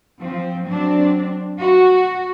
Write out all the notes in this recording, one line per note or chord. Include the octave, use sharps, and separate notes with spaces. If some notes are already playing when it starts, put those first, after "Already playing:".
F3 C4
F#3 C4 D4
F#4